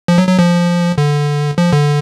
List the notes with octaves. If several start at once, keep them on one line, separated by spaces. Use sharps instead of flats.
F3
F#3
F#3
F3
D3
F3
D3